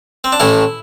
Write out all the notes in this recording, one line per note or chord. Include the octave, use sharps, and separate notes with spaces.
C4
D4
A1 A2 E3 E4